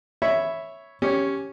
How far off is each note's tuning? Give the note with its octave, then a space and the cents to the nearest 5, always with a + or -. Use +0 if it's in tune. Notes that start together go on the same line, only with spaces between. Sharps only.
C#5 +0 E5 +0 B5 +0
C#4 +0 G4 +0 C#5 -15